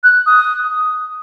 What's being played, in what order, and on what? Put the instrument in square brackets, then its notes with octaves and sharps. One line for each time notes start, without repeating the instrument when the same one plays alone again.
[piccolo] F#6
D#6